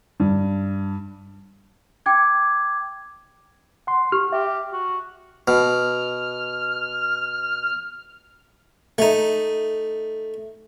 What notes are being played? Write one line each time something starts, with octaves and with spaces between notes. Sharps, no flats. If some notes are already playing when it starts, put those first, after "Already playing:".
G2
G5 D6 G#6
F#5 C6
G4 F6
G4 E5
F#4
B2 F6
A3 D#4